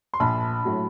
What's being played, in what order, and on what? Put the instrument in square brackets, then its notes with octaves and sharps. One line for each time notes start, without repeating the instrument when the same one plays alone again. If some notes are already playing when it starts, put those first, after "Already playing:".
[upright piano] C6
A#1 A5 B5
A2 F#3